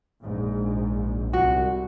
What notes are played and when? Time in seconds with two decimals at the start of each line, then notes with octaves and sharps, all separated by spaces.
0.22 A#1 G#2
1.33 C2 F#4